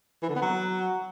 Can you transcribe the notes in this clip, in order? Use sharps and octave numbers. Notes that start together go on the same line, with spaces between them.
E3
D3
B3
F#3